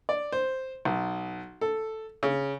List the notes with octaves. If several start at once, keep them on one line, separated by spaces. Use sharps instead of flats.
D5
C5
B1
A4
C#3